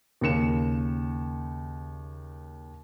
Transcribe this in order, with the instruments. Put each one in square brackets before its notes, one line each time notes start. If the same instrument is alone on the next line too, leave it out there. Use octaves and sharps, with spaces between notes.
[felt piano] D#2 C#3 C#7 E7